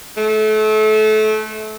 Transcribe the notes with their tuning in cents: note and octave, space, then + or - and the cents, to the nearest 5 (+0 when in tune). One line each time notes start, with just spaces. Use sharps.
A3 -30